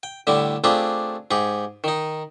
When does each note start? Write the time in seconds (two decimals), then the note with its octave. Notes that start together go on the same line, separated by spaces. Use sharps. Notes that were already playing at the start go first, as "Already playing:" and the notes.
0.03 G5
0.27 A2 D3 G3 E4
0.64 A3 C4 D4 F4 G4 G#4
1.31 G#2 G4 G#4
1.84 D#3 D#4